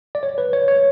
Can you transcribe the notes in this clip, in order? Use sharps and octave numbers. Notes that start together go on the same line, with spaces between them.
D5
C#5
B4
C#5
C#5